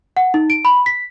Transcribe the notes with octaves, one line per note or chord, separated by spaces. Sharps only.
F#5
D#4
D7
B5
B6